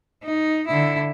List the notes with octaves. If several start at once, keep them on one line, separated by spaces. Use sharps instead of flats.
D#4
D3 E4